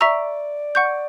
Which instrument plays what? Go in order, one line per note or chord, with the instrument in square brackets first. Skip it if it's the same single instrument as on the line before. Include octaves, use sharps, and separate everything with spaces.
[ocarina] D5 [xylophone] E5 A#5 C#6 E6
[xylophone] F#5 C#6 G6